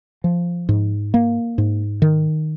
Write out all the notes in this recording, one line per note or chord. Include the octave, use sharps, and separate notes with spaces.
F3
G#2
A#3
G#2
D#3